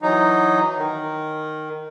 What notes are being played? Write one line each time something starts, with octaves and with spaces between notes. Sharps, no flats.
E3 F#3 D#4
D#3